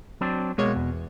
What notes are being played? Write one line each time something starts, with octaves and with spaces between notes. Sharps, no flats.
F#3 C4 D4
B2 G#3 A#3 C#5
E2